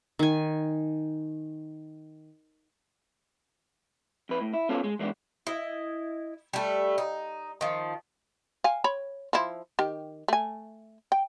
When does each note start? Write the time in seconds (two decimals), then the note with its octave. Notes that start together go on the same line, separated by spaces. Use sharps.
0.19 D#3 G#5
4.29 F2 B4
4.41 A2
4.54 E4
4.69 B3 C#4 F4 A4
4.84 G#3
4.99 E3 G#3 A3 B3 D4
5.47 E4 D#5
6.53 G3 A3
6.98 D#4
7.61 D#3 F3
8.64 F5 G#5
8.84 C#5 B5
9.33 F3 E4
9.79 D#3 G4
10.28 A3 G#5
11.12 G5